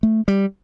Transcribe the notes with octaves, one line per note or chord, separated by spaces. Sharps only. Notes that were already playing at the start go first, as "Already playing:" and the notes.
A3
G3